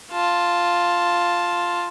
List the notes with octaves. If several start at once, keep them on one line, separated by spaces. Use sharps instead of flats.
F4 A5